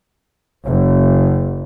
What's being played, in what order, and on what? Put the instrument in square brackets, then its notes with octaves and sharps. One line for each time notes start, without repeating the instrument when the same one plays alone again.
[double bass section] F#1